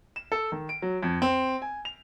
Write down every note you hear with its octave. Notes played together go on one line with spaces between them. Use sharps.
E7
A4
D#3
D7
F#3
F2
C4
G#5
F7